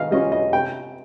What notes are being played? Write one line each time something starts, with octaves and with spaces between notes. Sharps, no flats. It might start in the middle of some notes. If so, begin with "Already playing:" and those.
Already playing: D#3 D#5 F5
G3 C#4 F4 D#5
D#5
C3 G5